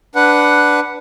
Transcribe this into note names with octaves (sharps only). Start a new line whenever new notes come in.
D4 B4 F#5